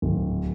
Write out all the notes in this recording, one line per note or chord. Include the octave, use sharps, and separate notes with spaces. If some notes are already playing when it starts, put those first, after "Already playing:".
D1